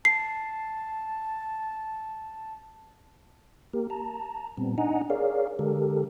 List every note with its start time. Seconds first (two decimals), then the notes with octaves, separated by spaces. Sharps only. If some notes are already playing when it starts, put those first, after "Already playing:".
0.05 A5 C7
3.73 A#3 G4 A#4
3.90 A5 A#5
4.57 A#2 G3 B3 C4
4.78 D4 D#4 D#5 F#5 G#5 A#5
5.10 G#4 A#4 C#5 D5 F5
5.59 D3 G#3 G4 A4 A#4